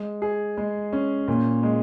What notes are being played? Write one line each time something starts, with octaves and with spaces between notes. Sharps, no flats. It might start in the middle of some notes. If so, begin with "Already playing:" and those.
Already playing: G#3
G#4
G#3
C#4
A#2
G#3